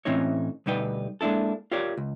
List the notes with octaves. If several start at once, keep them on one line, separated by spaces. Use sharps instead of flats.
A2 E3 C4 C#4 D#4 C#5
D2 B2 G3 D#4 B4 G5
G#3 A#3 D4 E4 A4
F4 G4 A#4 C#5 D5
C#2